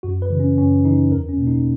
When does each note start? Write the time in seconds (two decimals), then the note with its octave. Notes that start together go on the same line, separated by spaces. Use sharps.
0.03 F#2 F#4
0.22 B4
0.30 C#3 E3
0.40 C#4
0.58 F#2 C#4
0.85 C#3 E3 D#4
1.11 E2 A#4
1.29 C#4
1.38 B2 A#3
1.47 D#4